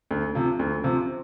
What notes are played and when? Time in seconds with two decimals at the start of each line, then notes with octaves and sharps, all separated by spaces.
0.11 D2
0.35 C3 F3
0.59 D2
0.84 C3 F3